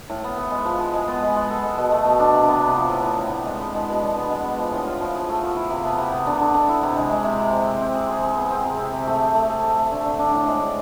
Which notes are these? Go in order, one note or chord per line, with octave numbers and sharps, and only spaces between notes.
A2
B3
B3
G#3
F3
F3
G#3
B3
G#3
G#3
A4
G#3
B2
A3
B2
D4
C3
B3
C3
F3
A2
A2
A2
A2
G#3
B3
G#3
B2
D3
B3
G#3
B3
F3
A2
F4
F3
G#4
A3
F3
E4
C3
B3
C3
B3
D3
D3
D3
E4
C3
G#3
G#3
C3
C3
C3
C4
C4
G#4
G#4
G#4
B3
C4
C3
C3
C3
A3
G#4
A3
G#4
A3
A3
D3
D3
D4
A2
G#3
A2